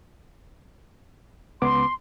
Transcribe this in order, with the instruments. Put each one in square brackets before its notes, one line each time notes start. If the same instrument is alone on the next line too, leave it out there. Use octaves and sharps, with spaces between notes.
[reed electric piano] C#2 B3 D6 [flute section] C6